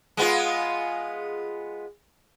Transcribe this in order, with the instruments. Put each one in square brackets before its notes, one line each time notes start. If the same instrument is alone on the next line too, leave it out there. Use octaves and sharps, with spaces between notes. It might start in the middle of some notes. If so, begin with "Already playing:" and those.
[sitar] G#3 B3 F4